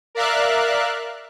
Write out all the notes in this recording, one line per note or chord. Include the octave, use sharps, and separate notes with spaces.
A#4 D5 E5 F5 F#6